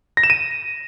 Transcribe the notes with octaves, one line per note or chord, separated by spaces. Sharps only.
A#6
E7
D#7